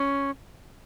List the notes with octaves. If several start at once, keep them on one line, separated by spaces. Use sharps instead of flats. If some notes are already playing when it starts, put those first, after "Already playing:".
Already playing: C#4